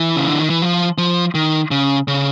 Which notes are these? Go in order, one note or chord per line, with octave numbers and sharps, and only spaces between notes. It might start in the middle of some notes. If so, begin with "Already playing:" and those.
Already playing: E3
C#3
D3
D#3
E3
F3
F3
D#3
C#3
C#3